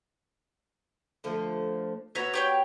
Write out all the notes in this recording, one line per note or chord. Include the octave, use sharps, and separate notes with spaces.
D3 F3 A3
B3 F#4 C#5 E5 A#5
G4 C#5 G5